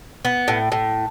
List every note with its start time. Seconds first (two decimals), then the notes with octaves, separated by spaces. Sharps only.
0.25 B3
0.48 A2
0.72 A2